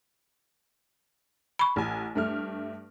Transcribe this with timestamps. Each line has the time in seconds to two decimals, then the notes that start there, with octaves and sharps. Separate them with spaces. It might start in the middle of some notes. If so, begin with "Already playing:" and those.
1.59 B5 C#6
1.76 A1 G#5
2.15 G2 A3 F6